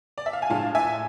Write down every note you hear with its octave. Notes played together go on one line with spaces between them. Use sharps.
D5
E5
F5
G#5
A2 F3 G#3 D4 F5 A5
E5 G#5